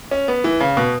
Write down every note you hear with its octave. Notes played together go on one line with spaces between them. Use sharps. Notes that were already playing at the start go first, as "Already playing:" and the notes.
C#4
B3
E3
C#3
B2